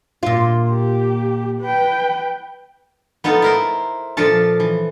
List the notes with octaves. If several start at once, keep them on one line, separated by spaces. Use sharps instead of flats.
A#2 F4
G4
B4 G5
B3 D#4 F4 A4
E4 A#4 C5
A#2 F3 F4 A4 A5
E3